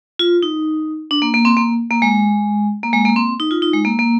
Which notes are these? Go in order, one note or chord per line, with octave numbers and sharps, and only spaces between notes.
F4
D#4
D4
A#3
A#3
C4
A#3
A#3
G#3
A#3
G#3
A#3
C4
D#4
F4
D#4
G#3
A#3
A#3